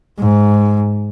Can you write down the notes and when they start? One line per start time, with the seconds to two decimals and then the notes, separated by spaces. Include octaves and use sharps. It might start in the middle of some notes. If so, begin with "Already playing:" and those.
0.20 G#2